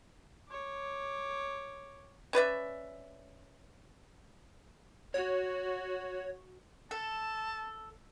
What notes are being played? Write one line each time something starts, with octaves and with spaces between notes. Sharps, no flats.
C#5 D6
C#4 B4 D5 E5
F#4 C#5
A4 A5